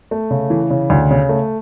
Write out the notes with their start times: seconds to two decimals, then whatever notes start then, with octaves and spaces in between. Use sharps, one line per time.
0.11 A3
0.30 C#3
0.50 E3
0.70 C#3
0.90 D2
1.11 C#3
1.29 A3